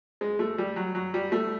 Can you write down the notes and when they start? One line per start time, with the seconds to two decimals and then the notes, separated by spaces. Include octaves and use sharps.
0.21 G#3
0.39 A3
0.58 G3
0.76 F#3
0.95 F#3
1.14 G3
1.32 A3